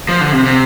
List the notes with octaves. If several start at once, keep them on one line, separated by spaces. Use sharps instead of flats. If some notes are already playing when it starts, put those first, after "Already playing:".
F3
D3
C3
C3